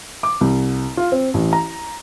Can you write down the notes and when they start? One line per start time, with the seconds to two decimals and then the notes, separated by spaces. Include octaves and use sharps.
0.23 D6
0.41 C2
0.97 F4
1.12 C4
1.34 A1
1.53 A#5